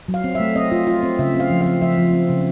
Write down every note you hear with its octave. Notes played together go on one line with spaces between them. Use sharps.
F#3
F5
C4
E5
A3
C4 D#5
F4
F4
C4
C#3 E5
C4
F5
F3
F5
C4
F3 E5
F3
C4
C#3